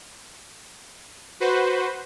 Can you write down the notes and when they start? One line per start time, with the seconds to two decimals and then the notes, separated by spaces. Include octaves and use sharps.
1.40 F#4 B4 C5